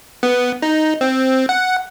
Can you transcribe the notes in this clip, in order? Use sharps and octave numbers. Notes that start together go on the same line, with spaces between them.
B3
D#4
C4
F#5